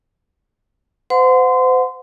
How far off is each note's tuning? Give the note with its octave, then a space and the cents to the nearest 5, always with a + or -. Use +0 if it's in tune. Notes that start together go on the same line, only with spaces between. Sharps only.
C5 -35 F#5 -25 C6 -25